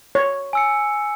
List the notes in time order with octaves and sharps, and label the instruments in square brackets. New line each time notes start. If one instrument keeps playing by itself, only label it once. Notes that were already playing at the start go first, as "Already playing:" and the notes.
[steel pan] C#5
[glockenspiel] G#5 E6 C#7